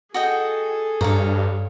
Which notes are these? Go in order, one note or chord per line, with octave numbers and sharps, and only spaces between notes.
F#4 G#4 A4 D#5 G5
G2 C#5 F5 A#5